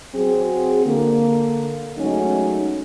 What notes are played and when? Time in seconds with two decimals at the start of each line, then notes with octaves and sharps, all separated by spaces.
0.15 F#3 C4 G#4
0.86 D3 A#3
1.98 F#3 G#3 A3 C#4 D#4